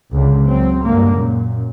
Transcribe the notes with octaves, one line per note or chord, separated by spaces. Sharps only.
C#2 D3
C#2 F#3 C4
G2 D3 G#3 A#3
F#2 A#2